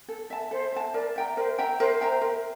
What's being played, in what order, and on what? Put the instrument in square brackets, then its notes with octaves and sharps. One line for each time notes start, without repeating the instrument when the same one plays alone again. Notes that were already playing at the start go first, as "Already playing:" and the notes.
[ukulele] A4
E5 A5
[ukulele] A4 [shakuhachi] C5
[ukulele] E5 A5
[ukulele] A#4 [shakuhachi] D5
[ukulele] E5 G5 A#5
[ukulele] A#4 [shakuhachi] C5
[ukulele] E5 G5 A#5
[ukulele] A#4 [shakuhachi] C5
[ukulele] E5 G5 A#5
A#4